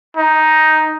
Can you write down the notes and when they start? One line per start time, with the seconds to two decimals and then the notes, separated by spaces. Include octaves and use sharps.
0.17 D#4